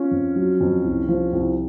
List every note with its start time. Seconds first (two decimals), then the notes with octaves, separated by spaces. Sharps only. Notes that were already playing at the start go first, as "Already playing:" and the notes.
Already playing: C#4 F4
0.11 F2
0.36 F#3
0.61 F2
0.84 C2
1.09 F3
1.33 C2